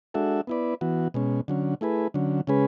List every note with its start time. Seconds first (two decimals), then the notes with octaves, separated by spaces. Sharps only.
0.14 G#3 D4 F#4 A4 E5
0.47 B3 E4 B4 D5
0.81 E3 B3 F#4
1.14 B2 G#3 C#4
1.48 D3 F#3 C#4
1.81 A3 E4 G#4 B4
2.14 D3 F#3 C#4
2.47 C#3 G#3 C#4 G#4 B4